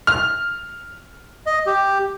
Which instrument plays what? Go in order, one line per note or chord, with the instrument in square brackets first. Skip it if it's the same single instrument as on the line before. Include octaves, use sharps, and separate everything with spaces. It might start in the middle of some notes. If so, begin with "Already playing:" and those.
[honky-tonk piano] F6
[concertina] D#5
G4